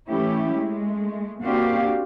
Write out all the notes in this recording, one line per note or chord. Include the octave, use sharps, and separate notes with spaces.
E3 A3 C#4 E4 G4
G#3 A3
A#3 C4 D4 F#4 G4 F5